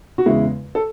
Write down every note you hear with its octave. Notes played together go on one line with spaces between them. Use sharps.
F#4
E2 C#3 G#3 E4
A4